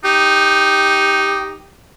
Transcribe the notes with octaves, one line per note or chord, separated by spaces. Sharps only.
D#4 G4